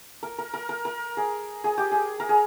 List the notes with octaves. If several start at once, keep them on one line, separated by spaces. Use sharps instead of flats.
A#4
A#4
A#4
A#4
A#4
G#4
G#4
G4
G#4
A#4
G#4